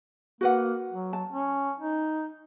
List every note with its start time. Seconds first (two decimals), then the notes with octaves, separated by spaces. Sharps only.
0.41 A#3 F#4 B4 F#5
0.92 F#3
1.13 A5
1.32 C#4
1.79 D#4